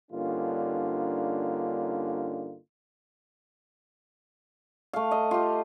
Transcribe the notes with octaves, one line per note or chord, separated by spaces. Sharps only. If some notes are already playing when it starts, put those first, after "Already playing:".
G2 D3 A#3 C#4 D#4 F4
A3 F5
D#5
F4 G4